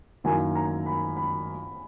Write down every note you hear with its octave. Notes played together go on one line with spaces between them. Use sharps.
F#2 D#3 A#3 E4 G#5
A#5
B5
B5